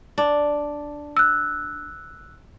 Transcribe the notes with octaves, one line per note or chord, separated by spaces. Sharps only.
D4
E6 F#6